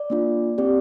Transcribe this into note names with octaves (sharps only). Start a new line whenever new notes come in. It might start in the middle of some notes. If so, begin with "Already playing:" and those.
Already playing: D5
A#3 D4 F4
C4 G4 D5